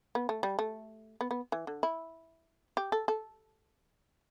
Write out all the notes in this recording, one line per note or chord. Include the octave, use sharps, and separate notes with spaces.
B3
A3
G3
A3
B3
B3
E3
D3
E4
G4
A4
A4